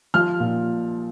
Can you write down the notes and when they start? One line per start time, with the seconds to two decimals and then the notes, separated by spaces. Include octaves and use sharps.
0.14 F3 F6
0.40 A#2